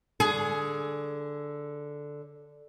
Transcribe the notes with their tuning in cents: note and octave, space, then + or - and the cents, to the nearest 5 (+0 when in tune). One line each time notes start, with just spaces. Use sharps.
D3 +0 G#4 +15